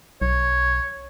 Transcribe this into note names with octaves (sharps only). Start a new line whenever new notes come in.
B1 C#5